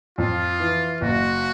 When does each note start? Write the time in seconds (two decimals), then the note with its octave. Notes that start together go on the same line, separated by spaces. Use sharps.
0.18 F2 F4
0.60 E3
1.01 F#1 F#4